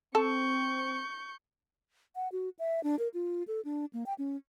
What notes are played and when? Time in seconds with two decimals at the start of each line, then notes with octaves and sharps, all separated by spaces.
0.15 C4 A4 C#6 G6
2.15 F#5
2.32 F#4
2.59 E5
2.83 D4
2.99 A#4
3.14 F4
3.48 A4
3.65 D4
3.93 A#3
4.06 G5
4.18 C#4